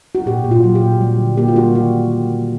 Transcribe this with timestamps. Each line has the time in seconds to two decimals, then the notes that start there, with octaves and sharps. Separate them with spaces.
0.15 F#4
0.26 A#2 G4
0.44 A#2
0.51 F4
0.64 F#3
0.75 G4
0.82 A#2
1.01 G3
1.19 D3
1.37 A#3 G4
1.48 F4
1.56 G3 F#4
1.74 D#3 F#4
1.93 D#3
2.12 G3
2.31 A#3